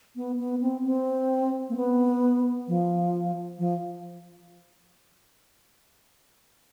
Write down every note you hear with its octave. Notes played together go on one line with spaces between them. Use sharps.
B3
B3
C4
C4
A#3
B3
F3
F3